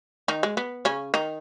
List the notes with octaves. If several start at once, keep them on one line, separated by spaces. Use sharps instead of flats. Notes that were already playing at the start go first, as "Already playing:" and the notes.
D#3 D#4
G#3
B3
C#3 C#4
D#3 D#4